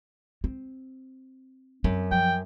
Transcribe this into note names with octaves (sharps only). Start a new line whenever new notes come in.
C4
F#2 C4
F3 G5